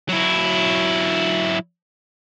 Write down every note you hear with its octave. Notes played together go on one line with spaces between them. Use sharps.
F#3 E4